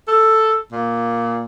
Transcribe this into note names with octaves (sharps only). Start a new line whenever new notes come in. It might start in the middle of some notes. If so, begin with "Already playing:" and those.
A4
A#2